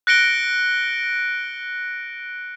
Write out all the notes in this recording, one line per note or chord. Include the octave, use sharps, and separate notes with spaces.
F#6 A#6 C#7 D7 G7